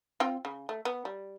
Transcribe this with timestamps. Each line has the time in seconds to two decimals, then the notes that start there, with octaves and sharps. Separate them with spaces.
0.20 C4 F4 G5
0.45 C#3
0.69 A3
0.85 B3
1.05 G3